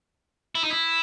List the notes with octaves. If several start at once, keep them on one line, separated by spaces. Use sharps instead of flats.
E4
D#4
E4